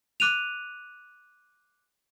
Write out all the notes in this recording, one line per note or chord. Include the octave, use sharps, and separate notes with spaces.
D6 F#6 D#7 F7